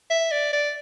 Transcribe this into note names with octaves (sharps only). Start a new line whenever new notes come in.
E5
D5
D5